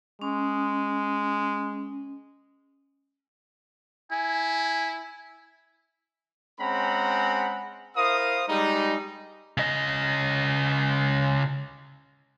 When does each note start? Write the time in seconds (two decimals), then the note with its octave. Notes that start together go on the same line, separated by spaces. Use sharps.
0.22 G#3 C#4
4.12 E4 G#5
6.60 G#3 C4 C#4 F#5 A#5 B5
7.96 E4 A#4 C5 F5 D#6
8.48 G3 G#3 D#4
9.57 C#3 D#5